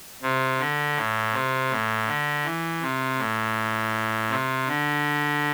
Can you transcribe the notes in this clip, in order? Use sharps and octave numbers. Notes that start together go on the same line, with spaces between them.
C3
D3
A2
C3
A2
D3
E3
C3
A2
C3
D3